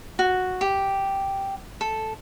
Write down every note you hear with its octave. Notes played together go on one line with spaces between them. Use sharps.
F#4
G4
A4